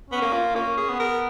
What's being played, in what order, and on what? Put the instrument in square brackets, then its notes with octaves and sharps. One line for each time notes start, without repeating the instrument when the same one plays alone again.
[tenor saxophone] B3 [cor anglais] C#4
[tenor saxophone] A#3
[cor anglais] F4
[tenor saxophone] A#3 [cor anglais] C#4
[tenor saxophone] G#4
[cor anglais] B3
[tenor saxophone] A#4